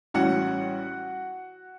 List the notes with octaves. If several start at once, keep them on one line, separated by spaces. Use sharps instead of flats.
A1 A2 G3 C#4 F#4 F#5